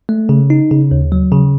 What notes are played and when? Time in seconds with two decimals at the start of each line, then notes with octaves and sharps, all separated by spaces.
0.09 A3
0.29 C#3
0.50 D#4
0.71 C#3
0.91 D#2
1.12 F#3
1.32 C#3